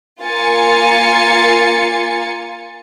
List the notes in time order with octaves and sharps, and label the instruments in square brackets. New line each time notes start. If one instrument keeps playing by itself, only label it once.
[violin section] A#3 F4 G#5 A6 C#7